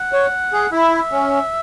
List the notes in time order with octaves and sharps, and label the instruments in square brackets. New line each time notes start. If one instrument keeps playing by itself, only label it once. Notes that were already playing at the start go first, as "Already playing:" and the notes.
Already playing: [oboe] F#5
[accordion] C#5
G#4
[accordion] E4 [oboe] E5
[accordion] C#4